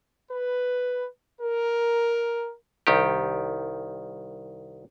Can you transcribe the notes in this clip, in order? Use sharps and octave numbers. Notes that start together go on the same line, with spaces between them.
B4
A#4
C2 D#3 G4